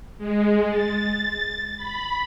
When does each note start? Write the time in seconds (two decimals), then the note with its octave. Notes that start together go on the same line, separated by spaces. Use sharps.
0.18 G#3
0.70 A6
1.77 B5